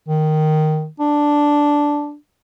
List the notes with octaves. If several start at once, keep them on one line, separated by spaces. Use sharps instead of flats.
D#3
D4